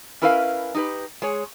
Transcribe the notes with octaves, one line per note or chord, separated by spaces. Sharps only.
C#4 E4 A#4 B4 E5 F5
D#4 G4 B4
G#3 G#4 C#5